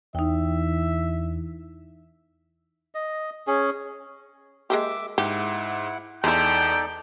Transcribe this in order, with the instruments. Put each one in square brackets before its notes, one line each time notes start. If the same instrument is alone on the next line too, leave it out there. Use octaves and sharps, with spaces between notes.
[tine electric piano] E2 [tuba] E3 [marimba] D#4 G5 [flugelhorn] E5
[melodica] D#5
C#4 G#4
[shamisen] G#3 A#3 G4 [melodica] E5 D6
[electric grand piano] G#2 [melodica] E4 F#5 [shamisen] G4
[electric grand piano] E2 [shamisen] G#3 E4 [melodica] D#4 A4 D5 [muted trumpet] G5